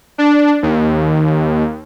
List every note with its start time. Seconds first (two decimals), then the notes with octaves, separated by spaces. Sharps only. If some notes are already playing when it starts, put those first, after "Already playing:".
0.18 D4
0.63 D#2